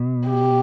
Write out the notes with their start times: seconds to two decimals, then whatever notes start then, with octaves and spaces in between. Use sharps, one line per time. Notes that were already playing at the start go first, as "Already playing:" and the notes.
Already playing: B2
0.28 G4